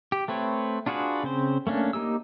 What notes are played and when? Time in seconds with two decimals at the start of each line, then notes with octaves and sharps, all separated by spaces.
0.12 G4
0.28 A3 C4 B4 C#5
0.86 D4 F4 F#4 G#4 B4
1.24 C#3 C4 C5
1.67 A3 A#3 C#4 D4
1.93 A#3 D#4 G4 E6